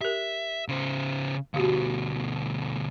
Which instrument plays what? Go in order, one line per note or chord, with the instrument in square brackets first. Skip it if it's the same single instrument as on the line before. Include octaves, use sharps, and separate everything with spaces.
[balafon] G4 A#4 [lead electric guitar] E5
[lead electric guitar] C#3 C5
[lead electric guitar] D2 B2 [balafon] F#4 G4 F5